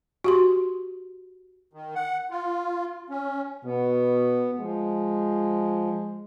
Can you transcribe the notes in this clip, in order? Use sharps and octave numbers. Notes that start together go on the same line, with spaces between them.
F#4 G4 C6
D#3
F#5
F4
C#4
B2 B3
F3 G#3